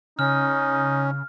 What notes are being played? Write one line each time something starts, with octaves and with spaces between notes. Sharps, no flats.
C#3 C#4 D#4 F6